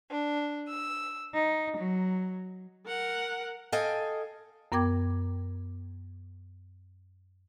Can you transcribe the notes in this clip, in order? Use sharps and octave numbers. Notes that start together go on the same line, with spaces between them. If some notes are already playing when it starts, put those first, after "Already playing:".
D4
E6
D#4
F#3
A#4 F#5
A4 D#5 F5 G5 G#5
F#2 B3 A#4 G5 D6 G#6